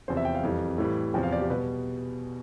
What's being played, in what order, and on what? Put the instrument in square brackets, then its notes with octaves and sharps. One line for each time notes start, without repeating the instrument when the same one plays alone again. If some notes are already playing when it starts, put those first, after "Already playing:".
[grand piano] E2 C3 F3 C5
E5
G5
F5
F2 E3 G3
A2 E3 G3
E2 C3 F3 G5
F5
D5
G4
B2 G3 B4